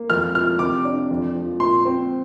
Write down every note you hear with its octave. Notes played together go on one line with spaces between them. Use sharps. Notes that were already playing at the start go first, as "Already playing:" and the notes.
Already playing: A#3
F2 F6
F3 F6
C3 D6
D4
F2
F3
A#2 C6
C4